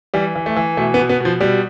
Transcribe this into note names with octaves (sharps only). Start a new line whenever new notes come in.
E3 G3
E3
A3
E3
B2 A3
B3
B2
B3
B2 F3
B2 G3